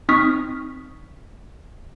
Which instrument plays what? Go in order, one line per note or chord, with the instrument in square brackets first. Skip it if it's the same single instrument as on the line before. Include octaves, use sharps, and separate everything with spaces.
[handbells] C4 D#4 C#6 D#6 F6 B6